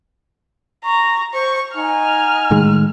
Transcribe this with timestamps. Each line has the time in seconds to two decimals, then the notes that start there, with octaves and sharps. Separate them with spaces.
0.85 A#5 C#6
1.33 C5 C#6
1.74 D#4 D#5 F#5 G#5 F6
2.51 A2 D#3 G#3